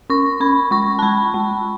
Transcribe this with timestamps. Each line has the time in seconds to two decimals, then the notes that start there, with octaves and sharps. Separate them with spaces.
0.10 C#4 C#6
0.40 C#4 B5
0.71 G#3 C#6
0.99 A5
1.02 G#3 B5
1.34 G#3